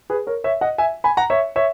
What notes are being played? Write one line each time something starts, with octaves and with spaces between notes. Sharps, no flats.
G#4 B4
A#4 C#5
C#5 E5
D#5 F#5
E5 G#5
G#5 B5
F#5 A#5
C#5 E5
C#5 E5